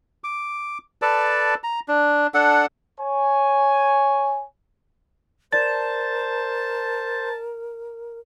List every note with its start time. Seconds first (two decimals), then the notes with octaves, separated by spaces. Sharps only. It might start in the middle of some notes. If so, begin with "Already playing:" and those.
0.24 D6
1.02 A4 B4 D5 A5
1.64 A#5
1.88 D4
2.34 D4 A4 F#5
3.00 C#5 G#5
5.52 A#4 C5 D5 A5 A6